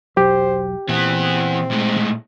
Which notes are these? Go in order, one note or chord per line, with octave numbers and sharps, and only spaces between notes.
E1 B1 F#3 G4 C5
A#2 E3 B3 C4
A2 G#3